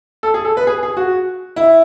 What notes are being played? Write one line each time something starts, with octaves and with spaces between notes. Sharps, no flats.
A4
G#4
A4
B4
G#4
G#4
F#4
E4